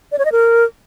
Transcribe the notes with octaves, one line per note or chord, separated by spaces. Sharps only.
D5
C#5
D#5
A#4